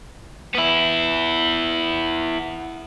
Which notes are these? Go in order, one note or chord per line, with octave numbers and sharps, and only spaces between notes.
B3 E4